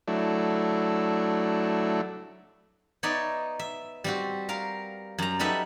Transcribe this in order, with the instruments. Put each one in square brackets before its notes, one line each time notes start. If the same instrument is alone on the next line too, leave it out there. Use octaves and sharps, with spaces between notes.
[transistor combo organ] F#3 A3 D4 E4
[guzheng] B3 D#4 C#5 D5 E5
E5
G3 C4 F#4
A#4 F5
F#2 A#5
G3 D#4 A4 B4 E5 F#5